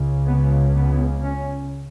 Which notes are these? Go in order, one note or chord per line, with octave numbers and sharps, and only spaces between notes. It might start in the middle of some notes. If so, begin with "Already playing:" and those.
Already playing: C#2 C#3
B3
B3
C#4